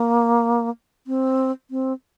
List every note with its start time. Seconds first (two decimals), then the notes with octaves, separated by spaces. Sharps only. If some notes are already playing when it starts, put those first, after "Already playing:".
Already playing: A#3
1.07 C4
1.71 C4